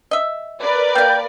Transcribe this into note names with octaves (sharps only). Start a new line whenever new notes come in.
D#5 E5
A#4 B4 D5
A#3 F5 G5